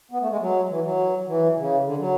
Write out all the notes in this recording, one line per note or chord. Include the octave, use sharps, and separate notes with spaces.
B3
A3
G#3
F#3
E3
F#3
E3
C#3
D3
F#3